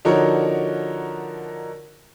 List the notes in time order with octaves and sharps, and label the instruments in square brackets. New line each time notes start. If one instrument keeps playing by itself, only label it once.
[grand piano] D3 F3 D#4 F#4 A#4 C#5